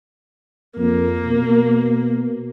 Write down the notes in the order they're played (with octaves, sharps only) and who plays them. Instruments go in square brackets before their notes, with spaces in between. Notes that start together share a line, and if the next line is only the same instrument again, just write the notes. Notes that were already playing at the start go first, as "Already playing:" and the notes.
[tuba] F2 [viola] A#3
[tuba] B2